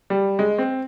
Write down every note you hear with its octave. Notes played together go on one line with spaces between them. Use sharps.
G3
G#3
C4